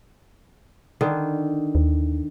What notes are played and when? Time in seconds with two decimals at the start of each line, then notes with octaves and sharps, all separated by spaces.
1.01 D3 D#3
1.75 D#2